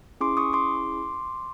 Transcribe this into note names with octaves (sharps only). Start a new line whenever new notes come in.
C#4 E4 G#4 C6 D6
C#6 D#6
C6 D6